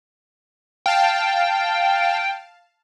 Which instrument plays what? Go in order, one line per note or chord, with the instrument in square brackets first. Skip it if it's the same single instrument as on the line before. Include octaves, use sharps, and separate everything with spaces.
[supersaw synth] F5 A5 [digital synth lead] G5